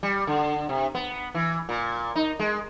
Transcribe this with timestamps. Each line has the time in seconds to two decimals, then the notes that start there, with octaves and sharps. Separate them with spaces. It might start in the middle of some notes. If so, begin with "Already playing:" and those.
0.03 G3
0.27 D3
0.69 C3
0.95 B3
1.35 E3
1.69 A#2
2.16 D#4
2.39 G#3